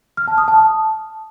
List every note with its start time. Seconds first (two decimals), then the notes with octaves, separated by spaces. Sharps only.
0.17 F6
0.28 A5
0.38 D#6
0.48 A5